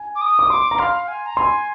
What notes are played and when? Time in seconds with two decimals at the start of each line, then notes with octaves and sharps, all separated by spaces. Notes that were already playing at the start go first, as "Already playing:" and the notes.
Already playing: G#5
0.16 D6
0.21 D#6
0.39 D6
0.50 C6 D6
0.71 A#5
0.79 F5 C6
1.08 G#5
1.26 A#5
1.36 G#5 C6